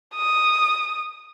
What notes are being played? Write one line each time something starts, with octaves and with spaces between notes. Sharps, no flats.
D#6